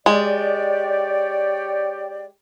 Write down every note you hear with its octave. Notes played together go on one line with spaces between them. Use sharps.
G#3 G4 C#5 D5